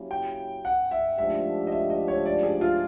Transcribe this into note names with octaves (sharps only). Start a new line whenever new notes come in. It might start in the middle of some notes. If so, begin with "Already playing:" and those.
Already playing: F#3 A#3 C#4 E4 G4
G5
F#5
E5
G#2 F3 A3 D4 G4 E5
D#5
E5
D#5
C#5
D5
G#4
F4